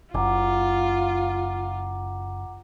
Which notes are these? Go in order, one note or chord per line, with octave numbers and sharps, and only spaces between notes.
F#1 F4 F#5 A#5 D6